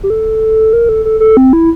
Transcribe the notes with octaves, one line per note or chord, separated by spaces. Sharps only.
G4
A4
A#4
A4
A4
A4
C4
E4